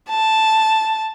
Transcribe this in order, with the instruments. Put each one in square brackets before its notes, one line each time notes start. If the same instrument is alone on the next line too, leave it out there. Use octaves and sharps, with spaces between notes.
[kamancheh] A5